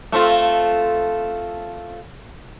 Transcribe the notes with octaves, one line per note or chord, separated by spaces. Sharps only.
A3 C4 F4